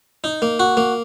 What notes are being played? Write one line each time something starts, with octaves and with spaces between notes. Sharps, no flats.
D#4
A#3
F#4
A#3